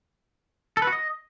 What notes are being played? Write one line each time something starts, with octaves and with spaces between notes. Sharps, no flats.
A4
B4
F#4
D#5